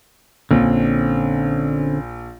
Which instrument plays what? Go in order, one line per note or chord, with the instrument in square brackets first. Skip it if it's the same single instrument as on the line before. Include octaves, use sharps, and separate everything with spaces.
[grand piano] A#1 [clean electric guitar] D3 C4 C#4